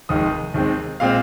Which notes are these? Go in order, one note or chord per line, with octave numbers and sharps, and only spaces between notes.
F1 D#2 D#3 G#3 D#6
D#2 D#3 G#3 C4
A#2 G#3 C4 F5